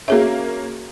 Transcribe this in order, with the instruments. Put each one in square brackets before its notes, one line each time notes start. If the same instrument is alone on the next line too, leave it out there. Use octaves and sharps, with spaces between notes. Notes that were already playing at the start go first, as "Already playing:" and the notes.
[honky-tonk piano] A#3 C#4 [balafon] F#4 G#4 E5